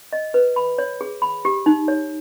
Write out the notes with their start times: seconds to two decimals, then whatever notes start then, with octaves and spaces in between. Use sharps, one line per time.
0.13 D#5
0.34 B4
0.56 B5
0.78 C#5
1.01 G#4
1.22 B5
1.45 G4
1.66 D#4
1.88 C#5